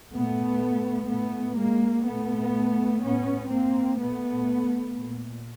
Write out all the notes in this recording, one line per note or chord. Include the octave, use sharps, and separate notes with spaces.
A#2 A3 B3
A2 A3 B3
G#3 A#3
A#2 A3 B3
A2 B3 C#4
A#3 C4
A#2 A3 B3
A#2